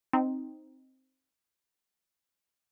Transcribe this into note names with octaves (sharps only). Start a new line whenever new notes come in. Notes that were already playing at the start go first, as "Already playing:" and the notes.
C4 D#4